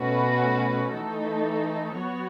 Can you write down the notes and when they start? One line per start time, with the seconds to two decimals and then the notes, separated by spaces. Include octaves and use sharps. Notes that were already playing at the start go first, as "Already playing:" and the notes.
Already playing: B2 A3 C#4 F#4 B4
0.92 E3 A3 D#4 A4
1.96 F#3 B3 F#4 C#5